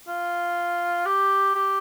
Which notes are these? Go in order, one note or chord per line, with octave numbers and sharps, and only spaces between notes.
F4
G4
G4